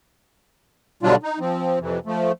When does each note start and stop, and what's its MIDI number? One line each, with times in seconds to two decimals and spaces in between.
1.03 1.16 47
1.03 1.16 50
1.03 1.16 54
1.03 1.16 55
1.03 1.16 62
1.03 1.16 65
1.23 1.39 63
1.39 1.79 53
1.39 1.79 60
1.81 2.00 41
1.81 2.00 48
1.81 2.00 52
2.06 2.32 53
2.06 2.32 57